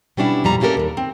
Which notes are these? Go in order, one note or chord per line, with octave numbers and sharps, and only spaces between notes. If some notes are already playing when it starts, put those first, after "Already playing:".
B2 G3 C#4 D4 E4
F2 A#2 G3 A#5
A3 A#3 C#4 G4 A4 A#4
D#2 D4
C4